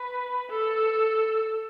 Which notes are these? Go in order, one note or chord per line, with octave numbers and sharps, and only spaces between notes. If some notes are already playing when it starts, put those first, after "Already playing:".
Already playing: B4
A4